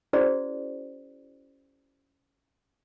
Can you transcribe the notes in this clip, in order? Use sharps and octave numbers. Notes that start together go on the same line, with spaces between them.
C#4 E4 F#4 G#4 C5 D5